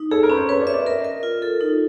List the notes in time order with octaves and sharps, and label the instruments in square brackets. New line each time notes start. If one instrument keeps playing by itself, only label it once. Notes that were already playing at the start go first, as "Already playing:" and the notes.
Already playing: [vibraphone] D#4
[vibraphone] G#4 [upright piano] A4
[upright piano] A#4
[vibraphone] C#4 [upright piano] B4
[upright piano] C5
[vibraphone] B4 [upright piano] C#5
[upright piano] D5
[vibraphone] E5
[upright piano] D5
[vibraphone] A#4 [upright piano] D#5
[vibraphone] A#4
F4
A4
D#4